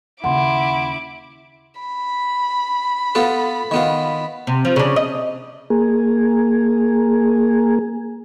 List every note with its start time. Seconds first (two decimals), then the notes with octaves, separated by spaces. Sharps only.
0.24 D#2 C#3 E4 F#5 C6 D6
1.81 B5
3.15 B3 F4 A4
3.71 D#3 B3 F4
4.47 C3
4.65 F3
4.76 C#3 D4
4.96 D#5
5.70 A#3 G#4